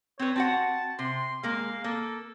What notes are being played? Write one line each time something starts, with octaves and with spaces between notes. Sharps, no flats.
C4 B4 C#5
C4 F#4 F#5 A5
C3 C6
G#3 A#3 F5
A#3 A4